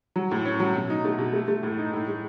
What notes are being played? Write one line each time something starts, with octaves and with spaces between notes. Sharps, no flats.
F#3
A2
C#4
F#3
B2
D#4
A3
B2
A3
A3
A2
D#4
A2
G#3